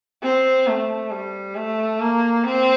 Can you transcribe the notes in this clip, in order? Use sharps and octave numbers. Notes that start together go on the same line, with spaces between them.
C4
A3
G3
A3
A#3
C4